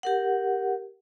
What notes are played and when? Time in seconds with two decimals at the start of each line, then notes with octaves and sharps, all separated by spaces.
0.03 G4 A#4 F#5